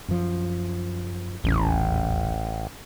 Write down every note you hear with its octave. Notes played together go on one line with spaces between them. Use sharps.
F#2 F3
D#1 A1 E2 C#4